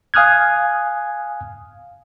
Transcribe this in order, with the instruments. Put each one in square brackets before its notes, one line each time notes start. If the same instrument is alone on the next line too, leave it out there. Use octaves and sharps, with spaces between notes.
[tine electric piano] F5 G#5 D#6 F6 F#6 G#6